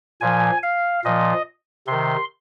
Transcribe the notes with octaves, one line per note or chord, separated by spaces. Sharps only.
A#2 F3 G#5
F5
A#2 F3 D#5
C3 D#3 C6